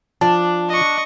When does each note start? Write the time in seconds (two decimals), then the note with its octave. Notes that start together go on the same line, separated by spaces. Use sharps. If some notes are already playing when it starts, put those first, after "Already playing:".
0.21 F3 D4 A5
0.69 D#5 C#6